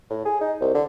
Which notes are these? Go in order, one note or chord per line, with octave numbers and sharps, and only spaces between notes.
A2
G#4
D#4
C2
D3